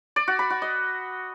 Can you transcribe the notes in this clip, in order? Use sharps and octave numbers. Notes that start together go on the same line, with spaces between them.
D5
F#4
B5
F#4
D#5